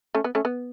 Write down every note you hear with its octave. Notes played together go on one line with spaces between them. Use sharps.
A3 C#4
B3
A3 C#4
B3